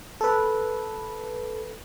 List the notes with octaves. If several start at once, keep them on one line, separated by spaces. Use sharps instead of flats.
A4 B4